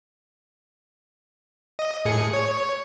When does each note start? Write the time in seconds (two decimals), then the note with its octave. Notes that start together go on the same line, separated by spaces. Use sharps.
1.79 D#5
2.05 A2 G#4 C#7
2.33 C#5